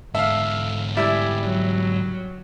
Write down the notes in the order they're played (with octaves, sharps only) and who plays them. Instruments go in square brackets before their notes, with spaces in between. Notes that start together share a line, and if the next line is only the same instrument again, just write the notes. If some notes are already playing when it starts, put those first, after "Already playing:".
[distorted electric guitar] G#2 D3 [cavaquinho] A4 [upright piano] E5 F5
[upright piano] G3 [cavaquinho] E4 E5 G#5 [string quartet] D5
[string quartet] F#3